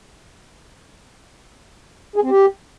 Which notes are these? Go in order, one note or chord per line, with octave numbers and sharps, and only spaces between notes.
G#4
C4
G4